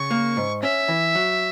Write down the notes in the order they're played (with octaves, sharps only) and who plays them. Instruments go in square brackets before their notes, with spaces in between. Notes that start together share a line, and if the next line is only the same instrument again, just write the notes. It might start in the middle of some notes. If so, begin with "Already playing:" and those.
Already playing: [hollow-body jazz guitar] C#3 [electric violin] C#6
[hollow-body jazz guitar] A#3
G#2
[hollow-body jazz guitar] C#4 [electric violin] E5
[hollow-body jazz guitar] E3
F#3